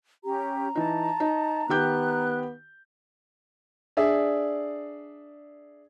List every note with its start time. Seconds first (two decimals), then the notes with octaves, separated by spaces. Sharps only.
0.24 C#4 G4 A#5
0.75 E3 D#4 A5
1.20 D#4
1.69 D#3 B3 G4 F#6 G6
3.97 D4 G#4 D5 E5